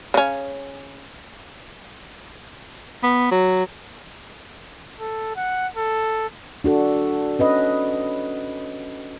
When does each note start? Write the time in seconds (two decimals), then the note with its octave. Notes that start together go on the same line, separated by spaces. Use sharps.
0.14 C#3 C#4
3.03 B3
3.31 F#3
5.00 A4
5.36 F#5
5.77 A4
6.64 D4 F#4 A4
7.39 C#4 B4 D#5